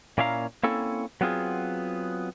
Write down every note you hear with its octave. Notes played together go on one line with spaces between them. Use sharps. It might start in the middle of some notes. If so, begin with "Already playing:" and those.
A#2 A#3 C#4 E4 F5 A#5
A#3 C4 C#4 E4 A4
F#3 B3 C4 F4 G#4